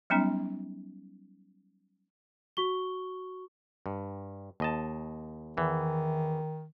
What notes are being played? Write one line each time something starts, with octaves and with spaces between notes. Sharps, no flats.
F#3 G3 B3 C#4 D#4
F#4 C#6 G7
G2
D#2 D#5 A5
E2 D#3 E3